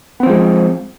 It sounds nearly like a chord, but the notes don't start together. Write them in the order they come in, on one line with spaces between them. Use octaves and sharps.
B3 C4 F3 G#3